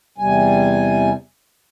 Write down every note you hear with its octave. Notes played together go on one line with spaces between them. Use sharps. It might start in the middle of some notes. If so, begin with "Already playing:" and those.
E2 C3 G3 G#5